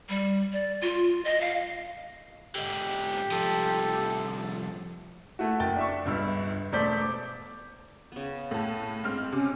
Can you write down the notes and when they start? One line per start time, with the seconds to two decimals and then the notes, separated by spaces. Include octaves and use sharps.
0.09 G3
0.53 D5
0.82 F4
1.25 D#5
1.41 F5
2.55 G#2 D3 G4
3.31 C2 F3 A4
5.39 A3 E4 F#4
5.60 F#1 G5 A6
5.76 D4 E5 C#6
6.05 G1 C#2 G2 E6
6.72 E1 A3 C5 D5 G6 B6
7.02 D6
8.12 C#3 B3
8.51 A2 A5
9.04 G#2 C4 F6
9.32 C3 C#4